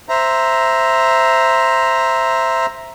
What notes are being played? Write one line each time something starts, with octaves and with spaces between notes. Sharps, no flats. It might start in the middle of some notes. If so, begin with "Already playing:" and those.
C5 E5 A#5